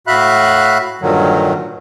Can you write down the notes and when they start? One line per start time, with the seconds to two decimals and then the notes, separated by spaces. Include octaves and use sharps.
0.07 A2 F#4 E5 F5 B5 F#6
1.01 G2 A#2 D3 D#3 F#3